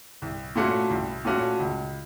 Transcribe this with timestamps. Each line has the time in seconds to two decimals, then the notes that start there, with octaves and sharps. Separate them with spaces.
0.22 C2
0.56 A#2 A3 C#4 F#4
0.90 C2
1.25 A#2 A3 C#4 F#4
1.60 C#2